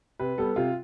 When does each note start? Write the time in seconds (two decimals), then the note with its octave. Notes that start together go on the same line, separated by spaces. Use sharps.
0.19 C3 B4
0.38 G3 B3 A4
0.56 C3 F4